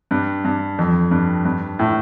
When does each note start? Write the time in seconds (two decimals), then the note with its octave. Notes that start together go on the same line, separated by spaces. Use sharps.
0.11 G2
0.45 G2
0.78 F2
1.11 G2
1.45 G2
1.79 A2